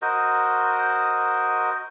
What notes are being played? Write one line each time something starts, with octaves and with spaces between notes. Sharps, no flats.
F#4 A#4 C5 D#5